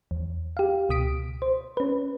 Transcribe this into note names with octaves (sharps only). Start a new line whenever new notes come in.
E2
G4 F5
C#2 B2 D#6 B6 D7
C5
C#4 B4